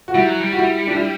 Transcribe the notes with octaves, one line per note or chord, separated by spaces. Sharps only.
F#4
G3 E4
F#3
G3
F#4
E4
D4
E4